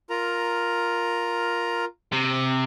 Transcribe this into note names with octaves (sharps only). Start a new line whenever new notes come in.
F4 A#4 A#5
C3